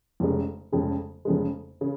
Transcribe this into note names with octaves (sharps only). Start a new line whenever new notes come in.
F1 F2 C#3 G#3
F1 F2 C#3 G#3
F1 F2 C#3 G#3
C#3